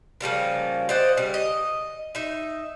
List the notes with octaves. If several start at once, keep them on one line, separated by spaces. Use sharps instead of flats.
C#3 F3 G3 A#3
C5 D5 D#5 F#5
C#3 G3
D#5
D#4 E5